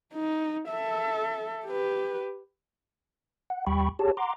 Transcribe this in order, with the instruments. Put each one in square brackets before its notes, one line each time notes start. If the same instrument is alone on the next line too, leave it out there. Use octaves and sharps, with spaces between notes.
[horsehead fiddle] D#4
A4 E5
G4 B4
[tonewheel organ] F#5
D#2 G3 G5 B5 C#6
G4 G#4 C#5 A5
F#5 A#5 C6 D6